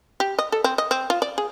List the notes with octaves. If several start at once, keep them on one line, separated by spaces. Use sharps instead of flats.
G4
D#5
A4
C4
D#5
C4
F4
D5
G#4